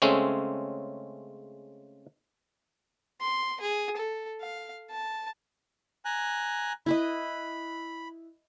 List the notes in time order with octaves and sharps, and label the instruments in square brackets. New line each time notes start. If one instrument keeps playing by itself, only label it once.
[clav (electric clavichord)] C#3 G#3 A3 C4 C#4
[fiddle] C6
G#4
A4
F5
A5
[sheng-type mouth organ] G#5 A#5 F#6
[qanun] E4 B4 D#5 [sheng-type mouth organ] B5